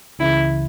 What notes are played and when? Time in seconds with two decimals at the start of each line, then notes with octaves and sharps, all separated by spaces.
0.19 C#2 C#3 E3 E4